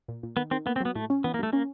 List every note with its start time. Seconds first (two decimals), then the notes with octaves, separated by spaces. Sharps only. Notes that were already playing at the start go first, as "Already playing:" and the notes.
0.08 A#2
0.23 A#2
0.37 D#3 B3
0.51 D#3 C4
0.66 A#3 B3
0.76 C4
0.81 F#3 B3
0.95 A2 A3
1.10 C#4
1.24 E3 B3
1.34 A#3
1.39 G2 A3
1.53 A#3 C#4